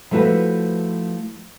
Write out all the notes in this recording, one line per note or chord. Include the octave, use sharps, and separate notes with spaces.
F3 A3 E4 F#4 B4